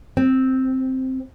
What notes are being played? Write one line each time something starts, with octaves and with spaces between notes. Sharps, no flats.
C4